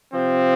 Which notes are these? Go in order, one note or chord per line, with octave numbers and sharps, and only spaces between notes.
C3 F3 C4